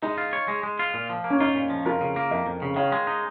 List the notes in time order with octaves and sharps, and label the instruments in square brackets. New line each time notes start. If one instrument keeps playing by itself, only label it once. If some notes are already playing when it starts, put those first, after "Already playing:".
[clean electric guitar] G#3 [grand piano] D#4
[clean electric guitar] F4
C#5
G#3
G#3
F4
A#2
F3
A#3
[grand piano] C#4
[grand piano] D#4 [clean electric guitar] F4
[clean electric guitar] A#2
F3
[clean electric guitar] F2 [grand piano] F4 A#4
[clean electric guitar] C#3
A#3
[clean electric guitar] F2 [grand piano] A#4 D#5
[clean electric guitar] F2
C#3
[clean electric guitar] D#3 [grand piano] C#5 F5
[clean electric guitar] G#3
D#4